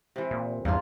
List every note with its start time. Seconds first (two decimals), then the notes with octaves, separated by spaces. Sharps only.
0.16 C3 E3
0.31 A#2
0.65 E2 G2 A#3 F4